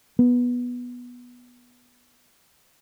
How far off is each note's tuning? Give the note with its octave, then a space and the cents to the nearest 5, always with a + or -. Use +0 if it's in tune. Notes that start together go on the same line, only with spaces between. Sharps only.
B3 -10